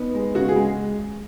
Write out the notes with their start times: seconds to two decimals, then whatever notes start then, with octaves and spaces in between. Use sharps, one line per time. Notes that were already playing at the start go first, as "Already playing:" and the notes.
Already playing: B3 D#4
0.15 G#3
0.35 C#3 F#4
0.48 G#4
0.56 G#3